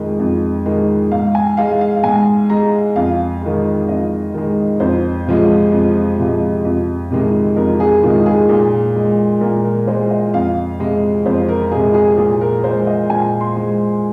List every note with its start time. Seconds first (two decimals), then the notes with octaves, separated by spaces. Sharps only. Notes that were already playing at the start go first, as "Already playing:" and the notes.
Already playing: F2 D#3 G#3
0.19 F2
0.66 D#3 G#3
1.11 G#2 F5
1.35 G#5
1.57 G#3 F5
1.81 F5
2.03 G#2 G#5
2.50 G#3 A#5
2.96 F2 F5
3.42 D#3 G#3
3.89 F2 D#5
4.34 D#3 G#3
4.80 F2 C5
5.27 C3 F3 G#3
5.72 F2
6.18 C3 F3 G#3
6.65 F2
7.11 C3 D#3 G#3
7.56 F2 A#4
7.80 G#4
8.02 C3 D#3 G#3 F4
8.26 G#4
8.49 A#2 G#4
8.96 G#3
9.41 A#2 A#4
9.64 A#4
9.87 G#3 C5
10.11 D#5
10.33 F2 F5
10.79 C3 G#3
11.26 F2 C5
11.49 A#4
11.72 C3 G#3 G#4
11.94 G#4
12.18 A#2 G#4
12.41 A#4
12.64 G#3 C5
12.87 D#5
13.10 A#2 G#5
13.41 C6
13.56 G#3